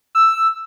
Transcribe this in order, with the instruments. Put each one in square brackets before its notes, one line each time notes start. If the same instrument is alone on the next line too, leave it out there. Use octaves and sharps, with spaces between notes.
[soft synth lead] E6